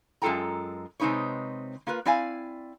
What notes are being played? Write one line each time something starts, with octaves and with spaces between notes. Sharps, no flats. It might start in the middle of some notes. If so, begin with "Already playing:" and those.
F#2 G#3 F4 A4 G5 A#5
C3 G#3 C4 D#4 B4 C#5
A#3 F4 A#4 B4
C4 E4 D5 F5 G#5